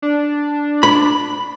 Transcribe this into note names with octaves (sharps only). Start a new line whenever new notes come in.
D4
B5